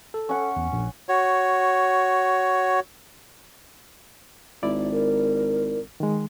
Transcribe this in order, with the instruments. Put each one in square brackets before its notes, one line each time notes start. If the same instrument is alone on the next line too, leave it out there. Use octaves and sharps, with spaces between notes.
[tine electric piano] A4
[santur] C#4 F#5
[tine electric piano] E2
A#1
[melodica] F#4 C#5
[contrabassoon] G#1 [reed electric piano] E4 D5
[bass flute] A#4
[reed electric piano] D#3 G#3